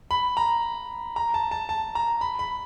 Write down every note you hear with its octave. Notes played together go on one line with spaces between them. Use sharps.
B5
A#5
A#5
A5
A5
A5
A#5
B5
B5